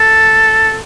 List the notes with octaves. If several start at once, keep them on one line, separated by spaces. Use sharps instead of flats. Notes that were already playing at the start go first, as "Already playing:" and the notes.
Already playing: A4